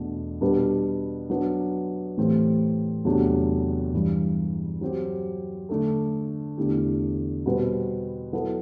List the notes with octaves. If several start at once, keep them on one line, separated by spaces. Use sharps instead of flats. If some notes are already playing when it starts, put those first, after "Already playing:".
Already playing: E2 B2 A3 D4
B2 G3 D4 G4 B4
F#3 B3 D4
A2 E3 A3 C4 G4
E2 C3 F#3 A3 D4
G2 E3 G3
F#3 C4 G4
D3 A3 D4 A4
E2 D3 A3 E4 G4
B2 G3 C4 F#4 B4
F#3 B3 E4 A4